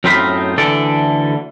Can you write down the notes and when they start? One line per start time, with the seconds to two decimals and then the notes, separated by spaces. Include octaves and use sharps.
0.04 F#2 A2 C4 D#4 F4 B5
0.58 D2 D3 E3 A4 D5